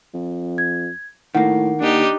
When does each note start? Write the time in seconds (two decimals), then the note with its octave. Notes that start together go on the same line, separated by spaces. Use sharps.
0.14 F2
0.58 G#6
1.35 A2 D#3 A#3 F#5
1.81 D#2 D4 D#4 G4